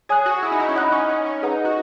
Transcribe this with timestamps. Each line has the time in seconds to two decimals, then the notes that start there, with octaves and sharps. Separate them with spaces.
0.09 G#4 C#5 G#5 D#6 F#6
0.26 F#4
0.43 E4
0.52 D#4
0.60 E4
0.69 C#4
0.76 D#4 D#5 F#5 B5 D#6 F#6
0.92 C#4
1.09 C#4
1.26 C#4
1.42 D#4 G#4 B4 F#5 A#5
1.65 F#4